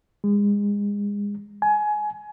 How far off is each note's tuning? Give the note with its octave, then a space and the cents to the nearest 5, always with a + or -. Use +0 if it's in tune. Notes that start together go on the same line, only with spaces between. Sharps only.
G#3 -30
G#5 +20